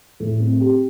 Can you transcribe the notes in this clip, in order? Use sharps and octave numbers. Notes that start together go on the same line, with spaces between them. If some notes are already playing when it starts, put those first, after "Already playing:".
A2
C4
G4